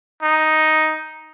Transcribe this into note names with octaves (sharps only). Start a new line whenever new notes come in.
D#4